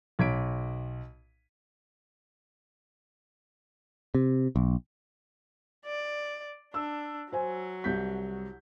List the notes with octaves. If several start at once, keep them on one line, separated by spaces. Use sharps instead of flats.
B1 G#6 B6 D7
C3
B1
D5
D4 E6
F#3 C5 G#5
C2 G6 B6